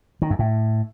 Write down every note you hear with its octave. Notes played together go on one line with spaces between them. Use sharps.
D#3
F#2
A2